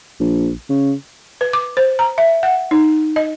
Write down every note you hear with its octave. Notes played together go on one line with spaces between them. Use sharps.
A#1
C#3
B4
D6
C5
A#5
E5
F#5
D#4
D#5